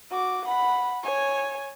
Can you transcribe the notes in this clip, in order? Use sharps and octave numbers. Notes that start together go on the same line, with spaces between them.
F#4 D6
F#5 B5
C#5 G#5